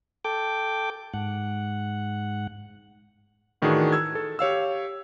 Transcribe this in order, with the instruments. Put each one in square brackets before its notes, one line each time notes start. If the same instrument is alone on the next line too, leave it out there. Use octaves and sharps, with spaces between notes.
[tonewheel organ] A4 G5 D6
G#2 F#5
[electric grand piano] A2 D#3 E3 D4 F#4 G#4
E6 G#6
A4
G4 C#5 F5 E6